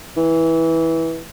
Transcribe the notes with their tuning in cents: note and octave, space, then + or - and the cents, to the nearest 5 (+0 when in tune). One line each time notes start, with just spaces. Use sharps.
E3 -15